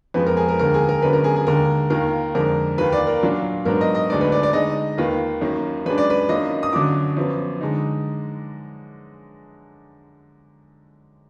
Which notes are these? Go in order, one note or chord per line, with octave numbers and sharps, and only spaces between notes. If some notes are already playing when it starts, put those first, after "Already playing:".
F2 F3 G#3 B3 B4
A#4
G#4
A#4
D#2 D3 G#3 A#4
G#4
A#4
F#2 D3 G#3 B3 B4
A#4
G#4
G#4
D#2 D3 G#3 A#4
D#2 D#3 A#3 F4 A#4
F2 D3 G#3 D4 A#4
D#2 D#3 A#3 F4 B4
D5
A#4
A#2 F#3 D4 F4
G#2 F#3 B3 D4 A#4
D#5
D#5
D2 D3 G#3 B3 D#4 D5
B4
D5
D5
D3 G#3 D#4 D#5
D#2 D#3 A#3 F4 B4
F#2 D#3 A#3
F#2 D#3 G#3 D4 B4
D5
B4
F#2 D#3 A#3 D4 F4 D#5
D#6
F#2 D3 F#3 D4 F4 D6
F#2 F3 B3 F4
D3 G#3 D#4